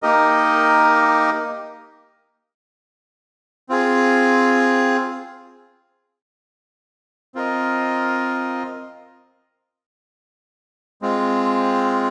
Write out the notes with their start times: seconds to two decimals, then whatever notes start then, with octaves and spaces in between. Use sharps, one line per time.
0.03 A#3 D#4 G4 A#4 D#5
3.69 C4 F4 G#4
7.35 C4 F4 A#4 D#5
11.02 G#3 C4 F4